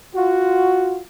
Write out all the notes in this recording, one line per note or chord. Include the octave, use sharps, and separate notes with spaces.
F4 F#4